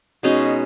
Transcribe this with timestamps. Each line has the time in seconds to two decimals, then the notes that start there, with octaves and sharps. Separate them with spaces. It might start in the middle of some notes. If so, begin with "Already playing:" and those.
0.23 B2 G#3 C#4 D#4